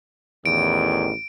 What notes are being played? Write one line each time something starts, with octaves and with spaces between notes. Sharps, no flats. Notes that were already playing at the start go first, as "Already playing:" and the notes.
A1 E2 D#3 D7